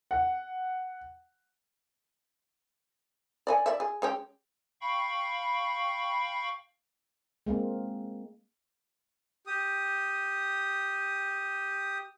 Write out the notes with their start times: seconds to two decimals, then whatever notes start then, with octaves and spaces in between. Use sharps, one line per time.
0.11 F#5
3.47 D5 D#5 G#5
3.66 D5 E5
3.80 G#4
4.02 G#3 C#4 G4
4.81 F5 G5 B5 C#6
7.46 G#3 A#3 C4
9.47 G4 D#6